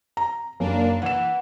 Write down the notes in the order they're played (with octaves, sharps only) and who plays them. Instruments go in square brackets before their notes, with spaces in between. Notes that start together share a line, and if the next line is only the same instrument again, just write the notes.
[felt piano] A#5
[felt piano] F#1 [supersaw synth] A#3 D4
[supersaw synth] E3 [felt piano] F#5 E7